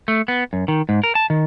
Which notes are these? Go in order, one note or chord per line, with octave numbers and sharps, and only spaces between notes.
A3
B3
F#2
D#3
G#2
A#4
A5
D#3